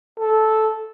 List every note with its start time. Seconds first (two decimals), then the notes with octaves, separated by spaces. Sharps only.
0.19 A4